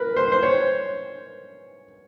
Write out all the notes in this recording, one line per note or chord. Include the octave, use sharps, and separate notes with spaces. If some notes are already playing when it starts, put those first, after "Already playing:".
Already playing: A#4 B4
C5
C5
C#5